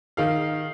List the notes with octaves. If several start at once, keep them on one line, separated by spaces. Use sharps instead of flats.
D#3 F5